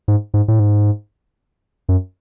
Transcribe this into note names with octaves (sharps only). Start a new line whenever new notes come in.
G#2
G#2
A2
G#2
F#2